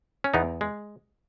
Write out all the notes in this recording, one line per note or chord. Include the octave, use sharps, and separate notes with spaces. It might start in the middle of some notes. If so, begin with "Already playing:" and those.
C#4
E2 B3 D#4
G#3